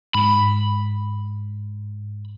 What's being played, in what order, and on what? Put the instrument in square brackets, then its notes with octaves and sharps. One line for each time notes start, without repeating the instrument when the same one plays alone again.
[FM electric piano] G#2 [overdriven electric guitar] B5